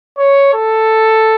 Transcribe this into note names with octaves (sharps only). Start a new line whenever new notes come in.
C#5
A4